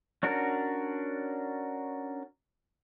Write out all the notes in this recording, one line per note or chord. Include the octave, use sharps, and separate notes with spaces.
C#4 D4 F#4 A#4